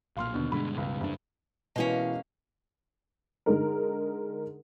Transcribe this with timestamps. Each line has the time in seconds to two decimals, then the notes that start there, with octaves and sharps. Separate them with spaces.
0.17 B1 A#2 F5 C6 F6
0.34 D#2 B2 D3
0.52 G2 B2 D3 G#3 B5
0.77 C#2
1.01 F#1 G2 D4
1.76 B2 E3 G#3 A#3 C#4
3.46 D3 G#3 D#4 A#4